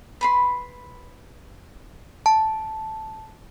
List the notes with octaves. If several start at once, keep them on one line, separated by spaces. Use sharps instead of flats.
B4 B5 C6
A5